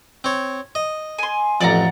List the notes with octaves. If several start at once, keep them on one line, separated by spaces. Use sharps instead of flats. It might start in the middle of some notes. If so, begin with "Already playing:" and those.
C4 C#5
D#5
G#5 C6
A1 F2 D5 F#5 A#5